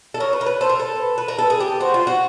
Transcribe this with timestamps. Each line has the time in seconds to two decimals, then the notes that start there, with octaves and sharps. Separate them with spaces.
0.14 A4
0.20 A#4 C#5
0.33 B4
0.41 A#4
0.46 B4
0.60 A4 C5
0.69 A#4
0.80 A4
1.00 B4
1.18 B4
1.28 A#4
1.39 A4 B4
1.50 G#4
1.60 G4
1.81 F#4 C5
1.94 F4
2.07 F#4